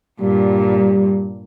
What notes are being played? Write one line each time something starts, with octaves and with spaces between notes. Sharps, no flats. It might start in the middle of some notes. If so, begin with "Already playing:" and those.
G2 A#2 G3